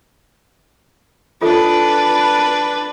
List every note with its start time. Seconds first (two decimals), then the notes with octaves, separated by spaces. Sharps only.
1.41 D4 F4 A4 B4